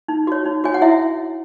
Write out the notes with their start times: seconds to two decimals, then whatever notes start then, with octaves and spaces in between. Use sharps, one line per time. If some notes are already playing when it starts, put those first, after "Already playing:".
0.08 D#4
0.27 F#4 C#5
0.45 D#4
0.64 F#4 C#5 G#5
0.74 F#5
0.82 E4 E5